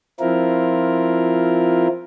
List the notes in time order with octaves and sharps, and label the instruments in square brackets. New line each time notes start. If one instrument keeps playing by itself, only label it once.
[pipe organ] F3 C4 E4 F4 A#4